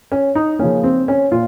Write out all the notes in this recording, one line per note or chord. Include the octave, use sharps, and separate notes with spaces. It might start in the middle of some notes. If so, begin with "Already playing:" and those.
C#4
D#4
C#3 F3 A#3 C#4
C4
C#4
A#2 F4